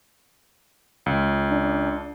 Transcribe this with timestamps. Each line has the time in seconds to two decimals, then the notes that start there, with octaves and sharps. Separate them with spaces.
1.06 C#2
1.51 D4